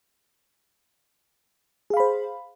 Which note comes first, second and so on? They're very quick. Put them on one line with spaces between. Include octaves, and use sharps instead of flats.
G#4 F5 B5 C5